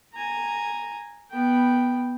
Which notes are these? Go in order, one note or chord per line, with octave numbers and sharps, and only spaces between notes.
G#5 A#5
B3 G5